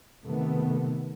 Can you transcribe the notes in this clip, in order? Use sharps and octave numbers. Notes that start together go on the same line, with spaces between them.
C3 D#3 A3 B3